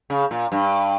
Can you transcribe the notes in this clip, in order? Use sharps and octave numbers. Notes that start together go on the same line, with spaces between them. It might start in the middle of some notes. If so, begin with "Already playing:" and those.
C#3
A#2
G2